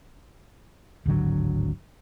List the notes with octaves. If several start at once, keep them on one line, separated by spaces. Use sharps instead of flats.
D1 G#1 D3 F#3